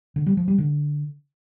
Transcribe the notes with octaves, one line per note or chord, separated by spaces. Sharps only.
D3
G3
F3
G3
D3